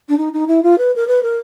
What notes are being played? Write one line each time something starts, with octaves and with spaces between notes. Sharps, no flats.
D4
D#4
D#4
E4
F4
B4
A#4
B4
A#4